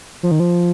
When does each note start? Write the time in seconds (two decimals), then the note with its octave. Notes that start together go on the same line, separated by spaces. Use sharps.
0.23 F3
0.31 D#3
0.40 F3